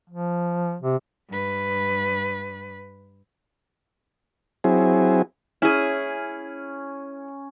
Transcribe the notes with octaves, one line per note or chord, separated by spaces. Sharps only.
F3
C3
G2 B4
F#3 C4 E4 G#4
C#4 E4 G#4